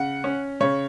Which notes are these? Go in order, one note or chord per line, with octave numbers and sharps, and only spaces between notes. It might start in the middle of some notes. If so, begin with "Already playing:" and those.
Already playing: C#3 F#5
C#4
C#3 C#5